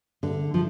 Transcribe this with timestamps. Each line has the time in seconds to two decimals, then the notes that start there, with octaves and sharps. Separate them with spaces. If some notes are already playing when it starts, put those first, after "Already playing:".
0.23 D3
0.54 F3